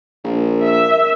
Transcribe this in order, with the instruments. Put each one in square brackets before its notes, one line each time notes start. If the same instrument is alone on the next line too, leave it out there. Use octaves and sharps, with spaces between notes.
[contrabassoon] A#1 [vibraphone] A#4
[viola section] E5